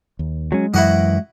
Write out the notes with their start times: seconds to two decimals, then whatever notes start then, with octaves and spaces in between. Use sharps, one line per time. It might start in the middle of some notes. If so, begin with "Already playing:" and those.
0.19 D#2
0.52 F#3 G#3 C#4
0.74 F#2 E3 E4 F#4 D#5